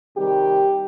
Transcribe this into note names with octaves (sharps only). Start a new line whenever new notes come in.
C3 D#3 G3 G4